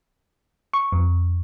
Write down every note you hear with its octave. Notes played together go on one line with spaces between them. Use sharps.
C#6
F2